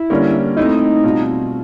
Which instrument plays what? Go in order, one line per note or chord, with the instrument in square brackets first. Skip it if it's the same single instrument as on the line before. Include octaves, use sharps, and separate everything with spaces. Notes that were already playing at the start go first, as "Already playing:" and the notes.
Already playing: [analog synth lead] E4
[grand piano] D3 G3 A#3 C#4
[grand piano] A3 C4 E4 [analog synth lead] D#4
[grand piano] B2 G3 C4 F4